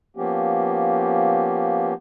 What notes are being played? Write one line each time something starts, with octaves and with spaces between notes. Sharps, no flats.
F3 A#3 B3 C#4 G4